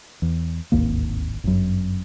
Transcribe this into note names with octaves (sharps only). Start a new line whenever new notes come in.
E2
D1 G#1 D#2 A#3
G1 F#2